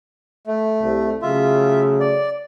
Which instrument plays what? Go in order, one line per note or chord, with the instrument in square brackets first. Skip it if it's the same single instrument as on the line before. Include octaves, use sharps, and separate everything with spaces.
[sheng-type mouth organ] A3
[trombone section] C2
[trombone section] C#3 F#3 A3 [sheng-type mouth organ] F4 E5
[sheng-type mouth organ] D5